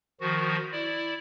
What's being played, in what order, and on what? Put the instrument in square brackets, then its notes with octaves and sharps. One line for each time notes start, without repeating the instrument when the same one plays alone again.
[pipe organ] D#3 F3 F#4
E4 D5